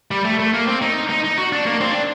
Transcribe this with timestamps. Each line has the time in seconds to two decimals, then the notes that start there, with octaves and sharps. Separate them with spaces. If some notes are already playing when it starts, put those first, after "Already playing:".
0.11 G3
0.25 A3
0.40 A3
0.54 A#3
0.67 C4
0.82 D#4
1.10 D#4
1.24 D#4
1.38 F#4
1.53 D4
1.66 A#3
1.81 C4
1.90 D4